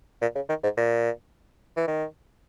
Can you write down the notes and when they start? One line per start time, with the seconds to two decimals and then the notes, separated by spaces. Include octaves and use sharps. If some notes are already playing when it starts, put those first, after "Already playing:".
0.22 A#2
0.35 C#3
0.49 D#3
0.63 G#2
0.77 A#2
1.77 E3
1.87 D#3